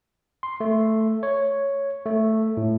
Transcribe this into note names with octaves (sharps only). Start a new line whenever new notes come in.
C6
A3
C#5
A3
A2